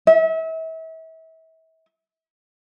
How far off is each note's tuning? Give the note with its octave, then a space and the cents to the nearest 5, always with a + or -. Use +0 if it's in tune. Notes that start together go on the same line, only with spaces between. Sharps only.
E5 -35